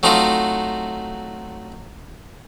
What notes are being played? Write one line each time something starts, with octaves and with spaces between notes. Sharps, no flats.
F#3 A3 C4 D#4 F4 F#4